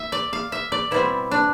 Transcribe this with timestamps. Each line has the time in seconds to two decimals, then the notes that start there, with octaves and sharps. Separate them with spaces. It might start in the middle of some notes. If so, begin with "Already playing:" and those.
Already playing: E5
0.12 D5
0.33 F5
0.52 E5
0.72 D5
0.91 B2 G3 C4 E4
1.31 D4